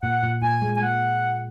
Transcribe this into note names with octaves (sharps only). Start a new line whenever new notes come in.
A#2 F#5
A#2
A#2 G#5
G#3
G#5
G#3 F#5